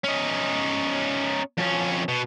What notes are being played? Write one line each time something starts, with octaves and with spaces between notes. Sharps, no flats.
C#4 D#4
F2 C#4
B2